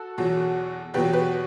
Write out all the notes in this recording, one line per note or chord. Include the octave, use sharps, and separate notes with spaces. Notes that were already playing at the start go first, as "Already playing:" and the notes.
Already playing: F#4 A4
E2 B2 F#3
E2 B2 F#3 G4 B4
G4 B4